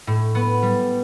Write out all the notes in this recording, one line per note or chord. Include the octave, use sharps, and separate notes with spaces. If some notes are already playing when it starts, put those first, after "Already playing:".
A2
B3
G3